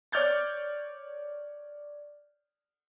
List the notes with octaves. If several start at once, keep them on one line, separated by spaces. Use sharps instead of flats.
C#5 D5 F6 G6 A6